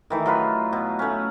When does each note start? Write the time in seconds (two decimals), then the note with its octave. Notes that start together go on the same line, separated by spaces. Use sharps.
0.10 D#3 E3 A3
0.26 F#3 F4 B4
0.73 B2
0.99 A3 C#4